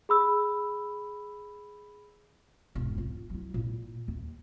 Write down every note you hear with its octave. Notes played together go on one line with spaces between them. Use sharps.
G#4 B5 E6
E1 G#2
D#4 F4
F#3 E4
A#2 E4
D#2